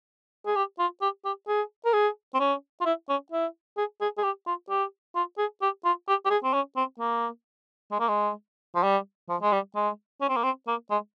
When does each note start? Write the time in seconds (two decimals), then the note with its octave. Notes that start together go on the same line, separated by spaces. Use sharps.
0.46 G#4
0.56 G4
0.79 F4
1.02 G4
1.25 G4
1.48 G#4
1.86 A#4
1.94 G#4
2.35 C4
2.40 C#4
2.81 F4
2.86 E4
3.09 C#4
3.32 E4
3.77 G#4
4.01 G#4
4.18 G#4
4.24 G4
4.47 F4
4.70 G4
5.16 F4
5.38 G#4
5.62 G4
5.85 F4
6.08 G4
6.26 G4
6.30 G#4
6.44 C4
6.54 C#4
6.76 C4
7.00 A#3
7.91 G#3
8.00 A#3
8.08 G#3
8.75 F3
8.83 G3
9.29 F3
9.42 G#3
9.52 G3
9.75 G#3
10.21 C#4
10.29 C4
10.36 A#3
10.43 C4
10.68 A#3
10.91 G#3